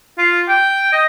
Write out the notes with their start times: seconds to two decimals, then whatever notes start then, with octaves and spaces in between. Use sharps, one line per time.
0.18 F4
0.49 G5
0.93 D#5